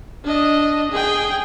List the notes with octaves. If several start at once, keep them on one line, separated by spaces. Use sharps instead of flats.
D4 D#5
G#4 G5